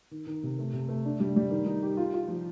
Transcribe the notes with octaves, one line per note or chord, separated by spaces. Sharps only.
D#3
D#3
C3
A3
C3
A3
D4
G3
G3
D#3
D#4
G4
F4
F4
F3